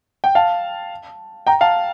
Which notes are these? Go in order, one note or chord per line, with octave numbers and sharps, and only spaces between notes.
G5
F5 A5
G5 A#5
F5 A5